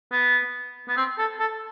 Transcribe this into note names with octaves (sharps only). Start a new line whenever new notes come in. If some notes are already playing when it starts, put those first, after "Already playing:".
B3
B3
C4
A4
A4